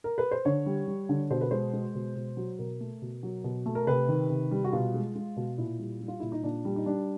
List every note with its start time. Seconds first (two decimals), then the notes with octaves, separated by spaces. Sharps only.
0.04 A#4
0.18 B4
0.31 C5
0.45 D3 C#5
0.66 G3
0.88 G3
1.09 D3
1.30 B2 C5
1.41 B4
1.51 G#3 C5
1.73 G#3
1.95 B2
2.16 B2
2.37 F#3
2.59 B2 A#4
2.81 A3
3.02 B2
3.23 F#3
3.44 B2
3.66 A3
3.75 A#4
3.87 C3 B4
4.08 D#3
4.30 C3
4.51 G3
4.64 F#4
4.72 B2 F4
4.94 G#3
5.15 G#3
5.37 B2
5.57 A#2 E4
5.79 G3
6.01 G3
6.08 F4
6.20 A#2 E4
6.32 D#4
6.44 A#2 D4
6.65 G3
6.76 D#4
6.86 G3 D4